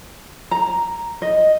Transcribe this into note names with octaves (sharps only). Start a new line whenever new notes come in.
A#5
D#5